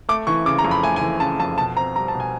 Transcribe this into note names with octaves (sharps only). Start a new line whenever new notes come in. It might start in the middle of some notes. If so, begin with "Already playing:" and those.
A3 D6
E3 C#6
C#3 D6
A#5
F2
B5
A3 G#5
G#5
E3
C#3 A5
F2 A5
B2 A5
C4 A#5
G3 A#5
A5
B2
G#5